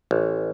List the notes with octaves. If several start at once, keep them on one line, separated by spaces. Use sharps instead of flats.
A1